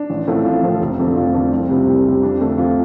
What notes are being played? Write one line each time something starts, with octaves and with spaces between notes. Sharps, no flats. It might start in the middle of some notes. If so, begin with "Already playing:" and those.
Already playing: D4
A1
A2 F3 A3 C4
A1 F4
A2 F3 A3 C4
F1
F2 D3 A3 C4
F1 F4
F2 D3 A3 C4
C2 F4
C3 G3 C4
C2
C3 G3 C4
F2 D4
D3 A3 C4
F2 F4